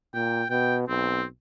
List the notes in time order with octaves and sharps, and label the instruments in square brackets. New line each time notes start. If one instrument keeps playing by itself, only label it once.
[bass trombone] A#2 [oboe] G5
[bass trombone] B2 [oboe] G5
[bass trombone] B1 [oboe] C4